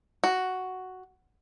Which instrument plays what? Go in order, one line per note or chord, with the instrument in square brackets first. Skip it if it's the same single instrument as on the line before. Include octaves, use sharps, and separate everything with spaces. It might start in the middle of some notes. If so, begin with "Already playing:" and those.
[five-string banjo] F#4